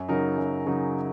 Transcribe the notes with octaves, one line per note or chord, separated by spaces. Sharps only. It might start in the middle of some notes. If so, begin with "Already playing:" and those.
Already playing: F#2
C#3 F#3 D#4 A#4
F#2
C#3 F#3 D#4 A#4